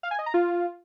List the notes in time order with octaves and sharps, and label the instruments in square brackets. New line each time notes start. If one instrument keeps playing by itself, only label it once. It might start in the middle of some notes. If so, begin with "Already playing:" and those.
[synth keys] F5
G#5
D#5
A#5
F4